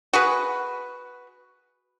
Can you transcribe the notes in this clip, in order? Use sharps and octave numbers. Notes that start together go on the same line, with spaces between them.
F#4 G#4 B4